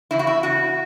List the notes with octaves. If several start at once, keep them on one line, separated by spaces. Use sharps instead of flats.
E2 C#3 E4
F#4
E4
E2 C#3 F#4